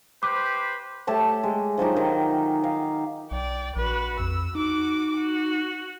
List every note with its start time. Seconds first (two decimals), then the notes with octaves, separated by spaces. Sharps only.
0.23 G4 B4 C5 D6
1.07 A3 G4 C#5 A5
1.43 G#3
1.78 F3 F#3 D#4 G4
1.96 D#3
2.64 D#4 F5
3.31 B1 D5 G5
3.76 A#1 F#4 B4
4.19 F2 E6
4.55 D#4 F#4 D6
5.16 F#4